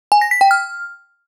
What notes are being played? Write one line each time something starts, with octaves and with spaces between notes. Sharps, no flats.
G#5
A#6
B6
G5
F6